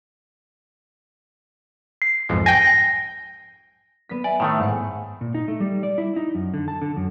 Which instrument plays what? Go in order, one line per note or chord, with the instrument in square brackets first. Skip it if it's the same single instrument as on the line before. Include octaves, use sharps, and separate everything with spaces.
[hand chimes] C7
[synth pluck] B1 F2 G#2
[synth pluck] G5 G#5 [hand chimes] A#6
[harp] B3 B6
[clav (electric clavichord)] D5 [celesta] E5 G#5
[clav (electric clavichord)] A2 D#3 A3
[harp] G#2 C#7
[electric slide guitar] A#2
D#4
A3
G3
D5
E4
D#4
F#2
D3
A5
D3
F#2